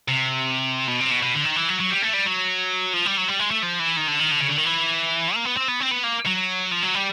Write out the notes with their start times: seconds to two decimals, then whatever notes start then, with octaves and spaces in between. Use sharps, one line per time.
0.08 C3
0.88 B2
1.00 C3
1.11 B2
1.22 B2
1.34 D3
1.45 D#3
1.56 E3
1.69 F#3
1.80 F#3
1.90 G3
2.02 A3
2.13 G3
2.26 F#3
2.93 F3
3.06 G3
3.17 F#3
3.28 G3
3.39 G#3
3.51 A3
3.63 F3
3.80 E3
3.97 D#3
4.08 D3
4.20 D#3
4.32 D3
4.40 C#3
4.48 D3
4.57 D#3
4.65 E3
5.35 A#3
5.45 B3
5.57 C4
5.68 B3
5.80 C4
5.91 B3
6.03 A#3
6.26 F#3
6.71 F3
6.82 F#3
6.95 G3